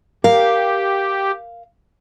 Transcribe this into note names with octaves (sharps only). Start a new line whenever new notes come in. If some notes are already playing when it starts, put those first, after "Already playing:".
G4 A#4 F5